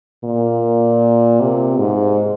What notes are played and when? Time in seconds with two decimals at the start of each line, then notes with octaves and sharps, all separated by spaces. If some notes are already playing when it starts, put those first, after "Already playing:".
0.24 A#2
1.41 C3
1.79 G#2